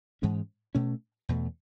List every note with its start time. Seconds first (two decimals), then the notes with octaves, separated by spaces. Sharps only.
0.22 G#2 E3 G#3 C#4
0.75 B2 A3 C#4
1.29 E2 B2 A3